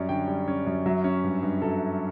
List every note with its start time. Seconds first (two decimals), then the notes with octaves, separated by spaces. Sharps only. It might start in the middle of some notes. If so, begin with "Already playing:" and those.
Already playing: F#2 G3 C#4 D5
0.09 D3 G5
0.28 G3
0.48 C#4
0.66 F#2
0.86 F#3 E5
1.04 C#4
1.24 G2
1.43 G2
1.62 F#3 A4